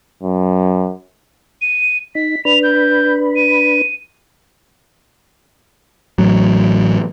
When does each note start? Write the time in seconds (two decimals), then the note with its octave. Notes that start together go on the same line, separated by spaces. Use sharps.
0.23 F#2
1.62 D#7
2.15 D#4 B6
2.45 D4 B4 B5 F7
2.63 G6
3.36 D#7
6.18 A1 A2 F#3